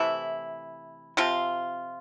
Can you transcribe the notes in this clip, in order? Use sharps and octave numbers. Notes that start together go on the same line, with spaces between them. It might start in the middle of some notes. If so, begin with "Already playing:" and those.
Already playing: C3 E3 A3 E4
C3 F3 C4 F4